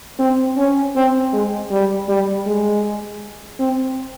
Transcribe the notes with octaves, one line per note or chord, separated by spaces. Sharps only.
C4
C#4
C4
G#3
G3
G3
G#3
C4